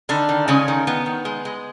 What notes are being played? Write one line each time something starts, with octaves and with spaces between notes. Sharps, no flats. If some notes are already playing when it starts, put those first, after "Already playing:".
D3 D#3 D4
D#3
C#3 G#3 C#4
D#3
D#3 B3
D#3
G#3
G#3